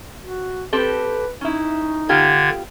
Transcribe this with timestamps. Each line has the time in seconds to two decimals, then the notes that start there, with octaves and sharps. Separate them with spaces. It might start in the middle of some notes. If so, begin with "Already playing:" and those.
0.20 F#4
0.73 C4 G4 A4 B4
1.41 C#4 D#4 E4
2.09 D3 B3 F4 G4 G#6